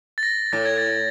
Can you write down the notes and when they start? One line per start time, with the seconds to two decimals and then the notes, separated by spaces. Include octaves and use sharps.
0.18 A6
0.23 A#6
0.53 A2 A6
0.65 G#6
0.78 A6